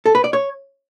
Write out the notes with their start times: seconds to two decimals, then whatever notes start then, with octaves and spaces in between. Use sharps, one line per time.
0.06 A4
0.15 B4
0.24 D5
0.33 C#5